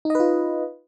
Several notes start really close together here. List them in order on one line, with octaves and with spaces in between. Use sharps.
D#4 D#5 B4 F4